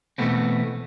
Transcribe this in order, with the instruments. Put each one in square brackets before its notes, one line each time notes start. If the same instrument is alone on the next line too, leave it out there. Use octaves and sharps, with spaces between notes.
[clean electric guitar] B2 E3 A3 B3 C4